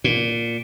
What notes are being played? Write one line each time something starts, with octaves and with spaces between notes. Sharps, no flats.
A#2